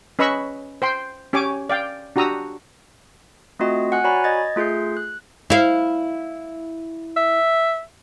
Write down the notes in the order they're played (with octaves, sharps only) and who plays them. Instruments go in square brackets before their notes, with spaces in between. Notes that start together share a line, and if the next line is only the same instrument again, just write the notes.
[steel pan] C#4 B4 D#5 B5 C#6 E6
C5 G5 C6
C#4 G4 C#5 G#5 D6
D5 F5 G5
D4 F#4 G4 A#5 D#6 E6
[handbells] A3 C4 F4 F#4 D#5
F#5 G#5 F#6
F#4 C#5 D5 G#5 A#5 B5
D#5 G#6 A6
A3 F4 G#4 G6 C7
F#6
[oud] E4 F5
[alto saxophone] E5